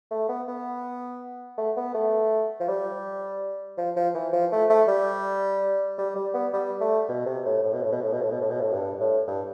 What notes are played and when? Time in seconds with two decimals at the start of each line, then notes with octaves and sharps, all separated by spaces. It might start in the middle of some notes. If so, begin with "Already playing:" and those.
0.11 A3
0.29 B3
0.48 B3
1.58 A3
1.77 B3
1.94 A3
2.60 F3
2.68 G3
3.78 F3
3.96 F3
4.15 E3
4.33 F3
4.52 A3
4.70 A3
4.88 G3
5.98 G3
6.16 G3
6.34 B3
6.54 G3
6.81 A3
7.09 B2
7.26 C3
7.45 A2
7.63 A2
7.73 B2
7.83 A2
7.92 B2
8.02 A2
8.12 B2
8.22 A2
8.32 B2
8.41 A2
8.50 B2
8.61 A2
8.73 G2
9.00 A2
9.28 G2